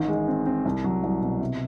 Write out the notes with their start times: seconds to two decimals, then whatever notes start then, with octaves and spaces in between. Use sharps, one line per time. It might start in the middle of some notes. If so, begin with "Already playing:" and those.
Already playing: A1 D#3
0.08 G#3
0.28 C4
0.46 C4
0.65 C2
0.84 F#3
1.04 C2
1.22 B2
1.41 C3